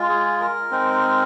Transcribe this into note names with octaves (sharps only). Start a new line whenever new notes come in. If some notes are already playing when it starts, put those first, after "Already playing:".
Already playing: G#3 F4
G#4
A#4
G#3 C4 D#4